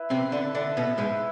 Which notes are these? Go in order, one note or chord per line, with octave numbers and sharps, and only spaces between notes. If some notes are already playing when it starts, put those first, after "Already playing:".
Already playing: E4 B4 E5
C3 C4
D3 D4
D3 D4
B2 B3
G#2 G#3